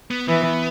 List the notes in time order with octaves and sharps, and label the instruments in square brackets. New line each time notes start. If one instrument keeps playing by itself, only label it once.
[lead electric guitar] B3
[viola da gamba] E3 [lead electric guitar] B3